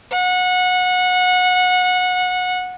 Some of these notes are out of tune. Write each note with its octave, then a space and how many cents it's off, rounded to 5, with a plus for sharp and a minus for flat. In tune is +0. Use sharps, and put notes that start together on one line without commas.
F#5 -20